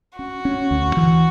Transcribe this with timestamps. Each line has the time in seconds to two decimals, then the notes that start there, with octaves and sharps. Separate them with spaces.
0.18 C#4 F#4
0.45 C#4
0.71 D2
0.97 E3